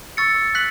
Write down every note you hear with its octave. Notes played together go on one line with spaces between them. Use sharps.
C#6 E6 A6 C#7
F#6 B6 F#7